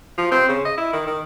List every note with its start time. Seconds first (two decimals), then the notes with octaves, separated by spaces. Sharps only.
0.18 F3
0.31 C4
0.48 C#3
0.65 D#5
0.78 E4
0.93 D#3
1.07 D#3